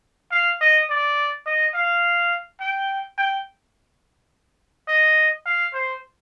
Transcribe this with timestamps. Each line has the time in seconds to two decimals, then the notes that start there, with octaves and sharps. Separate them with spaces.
0.32 F5
0.61 D#5
0.90 D5
1.46 D#5
1.75 F5
2.60 G5
3.18 G5
4.88 D#5
5.46 F5
5.74 C5